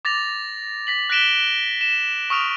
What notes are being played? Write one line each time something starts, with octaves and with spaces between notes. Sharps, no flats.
D6 A6 A#6 F7
A#6 B6 F#7
F#6 A#6 B6 D7 E7 G7
E7
C#6 D#6 F6 D7 F7